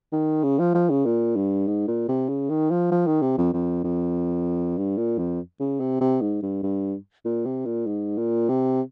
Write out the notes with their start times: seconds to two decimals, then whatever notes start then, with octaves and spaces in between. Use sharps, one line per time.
0.12 D#3
0.44 C#3
0.59 F3
0.74 F3
0.90 C#3
1.06 A#2
1.36 G2
1.68 G#2
1.88 A#2
2.09 C3
2.29 C#3
2.50 D#3
2.71 F3
2.92 F3
3.07 D#3
3.22 C3
3.38 F2
3.53 F2
3.84 F2
4.78 G2
4.98 A#2
5.18 F2
5.60 C#3
5.80 C3
6.01 C3
6.21 G#2
6.42 G2
6.63 G2
7.25 A#2
7.45 C3
7.66 A#2
7.87 G#2
8.18 A#2
8.49 C3